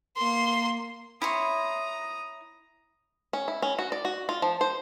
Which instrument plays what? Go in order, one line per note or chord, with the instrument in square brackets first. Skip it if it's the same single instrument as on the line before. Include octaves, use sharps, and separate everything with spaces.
[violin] A#3 C6
[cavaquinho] E4 C#5 C6 [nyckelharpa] A#5 D#6
[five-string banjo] C#4
E4
C#4
F#4
D5
F#4
F4
F3
C5